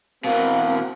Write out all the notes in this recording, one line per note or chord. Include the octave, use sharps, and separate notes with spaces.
B2 E3 C4 A#4 F5 F#5